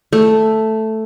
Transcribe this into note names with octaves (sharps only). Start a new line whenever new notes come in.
A3